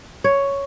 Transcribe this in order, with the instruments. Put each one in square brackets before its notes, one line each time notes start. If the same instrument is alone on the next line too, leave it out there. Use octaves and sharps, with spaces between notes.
[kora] C#5